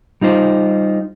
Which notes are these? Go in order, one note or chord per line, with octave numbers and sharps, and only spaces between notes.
G3 D#4 F4 C5